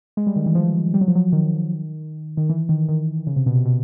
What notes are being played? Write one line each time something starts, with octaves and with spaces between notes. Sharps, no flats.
G#3
G3
D#3
E3
F3
G3
F#3
F3
F#3
D#3
D#3
E3
D#3
D#3
C#3
C3
B2
C3
B2